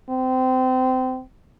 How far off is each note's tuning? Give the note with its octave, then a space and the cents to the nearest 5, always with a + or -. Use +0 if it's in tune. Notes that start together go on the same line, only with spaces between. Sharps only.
C4 -25